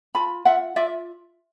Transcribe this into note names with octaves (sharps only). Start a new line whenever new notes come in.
F4 A5 B5
F4 E5 F#5
F4 D5 E5